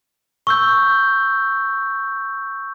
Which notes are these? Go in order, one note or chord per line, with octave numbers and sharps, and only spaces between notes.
C#6 E6 G6